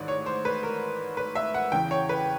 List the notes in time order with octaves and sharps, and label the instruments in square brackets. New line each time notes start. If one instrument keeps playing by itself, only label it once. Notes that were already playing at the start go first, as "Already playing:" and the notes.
Already playing: [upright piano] A1 G#2 D#3 D5
C#5
C5
B4
A#4
B4
E5
F#5
E2 C#3 E3 G5
C#5
B4